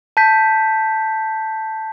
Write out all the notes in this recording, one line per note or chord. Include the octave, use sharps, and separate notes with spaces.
A5 G6 B6